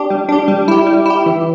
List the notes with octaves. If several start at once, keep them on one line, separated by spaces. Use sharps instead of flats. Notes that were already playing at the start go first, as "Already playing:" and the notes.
Already playing: D4 G4
G3
D4 G4
G3
E4 G4
G3
E4 G4
E3